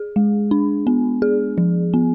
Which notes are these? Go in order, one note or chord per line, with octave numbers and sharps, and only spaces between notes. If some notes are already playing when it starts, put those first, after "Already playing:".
Already playing: G#4
G#3
D4
B3
G#4
F3
B3